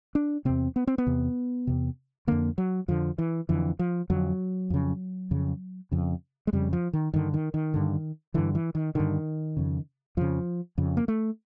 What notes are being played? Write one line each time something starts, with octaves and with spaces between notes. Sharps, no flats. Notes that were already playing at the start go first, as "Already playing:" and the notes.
D4
E2 C3 C4
B3
C4
B3
E2 C3
E2 C3
F2 D3 A#3
F#3
F2 D3 F3
E3
F2 D3 E3
F3
F2 D3 F#3
F2 C#3
F2 C#3
F2 C#3
G#3
F2 C#3 G3
F3
D#3
G2 D3 D#3
D#3
D#3
G2 D3
G2 D3 E3
E3
D#3
G2 D3 D#3
F2 C#3
F2 C#3 F3
F2 C#3
A#3
A3